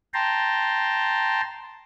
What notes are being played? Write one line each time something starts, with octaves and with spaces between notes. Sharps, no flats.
G5 A5 A#5 C6